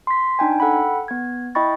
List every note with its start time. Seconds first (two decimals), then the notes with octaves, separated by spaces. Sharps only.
0.07 C6 B6
0.39 D4 D#4 G5 G#5
0.60 A4 F#5 G5 B5
1.08 B3 G#6
1.55 E4 D#5 G5 B5 C#6 A6